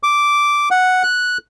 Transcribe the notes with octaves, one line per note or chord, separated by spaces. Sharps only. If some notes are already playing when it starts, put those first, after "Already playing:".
D6
F#5
F#6